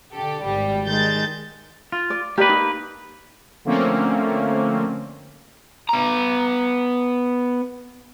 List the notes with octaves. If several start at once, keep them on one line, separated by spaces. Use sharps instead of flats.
D3 G4 A4
G#1 G3 G4
D#3 G#3 G6 A6
F4
D5
A#3 G4 B4 D5
D#4
D3 F3 A3 A#3 C4 C#4
B3 A#5